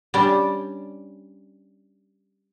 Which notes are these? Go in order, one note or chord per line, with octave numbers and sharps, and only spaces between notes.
G3 C#4 D4